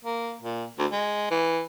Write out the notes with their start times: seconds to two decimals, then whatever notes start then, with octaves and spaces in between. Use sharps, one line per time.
0.05 A#3
0.42 A#2
0.79 D2
0.91 G#3
1.31 E3